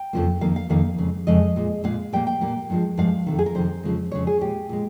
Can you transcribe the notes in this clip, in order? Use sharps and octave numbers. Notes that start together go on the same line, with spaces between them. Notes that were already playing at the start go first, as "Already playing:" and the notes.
Already playing: G5
F2 C#3 F3 A#3
F2 D#3 A#3 F5
F5
F2 D#3 A#3 F5
F2 C#3 G#3
F2 C#3 G#3 D#5
A#2 G#3
A#2 G#3 F5
A#2 G3 A#3 G5
G5
A#2 G3 A#3
G2 F3 G#3
G2 F3 G#3 F5
F2 C3 D#3
G#4
A#4
F2 C3 D#3 C5
F2 C#3 F3 G#3
F2 C#3 F3 G#3 C#5
G#4
A#2 G#3 G4
A#2 G#3